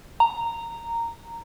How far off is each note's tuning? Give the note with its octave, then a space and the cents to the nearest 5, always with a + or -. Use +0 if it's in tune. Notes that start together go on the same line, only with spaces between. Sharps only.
A#5 -10